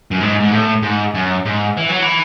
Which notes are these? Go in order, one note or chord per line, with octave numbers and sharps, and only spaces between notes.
F#2
G#2
G#2
A2
G#2
F#2
G#2
E3
F#3
E3